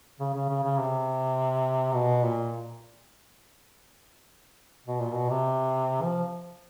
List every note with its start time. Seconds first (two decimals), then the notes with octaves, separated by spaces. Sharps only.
0.20 C#3
0.34 C#3
0.49 C#3
0.63 C#3
0.78 C3
1.94 B2
2.24 A#2
4.86 B2
5.00 A#2
5.15 B2
5.30 C3
6.02 F3